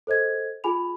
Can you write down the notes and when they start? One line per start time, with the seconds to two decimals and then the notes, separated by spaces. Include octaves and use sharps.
0.07 A4 C5 D#5 G#6
0.64 F4 G#4 G#5 B5 F7